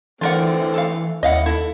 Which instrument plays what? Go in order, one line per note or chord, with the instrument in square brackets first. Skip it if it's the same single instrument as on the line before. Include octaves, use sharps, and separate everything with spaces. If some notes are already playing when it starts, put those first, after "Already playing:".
[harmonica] D3 A3 C4 [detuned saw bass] E3 [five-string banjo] F4 A#4 F#5
[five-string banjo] A4 F5
[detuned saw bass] D#2 [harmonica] E4 [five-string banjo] D#5 F5 F#5
[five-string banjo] E4 [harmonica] A4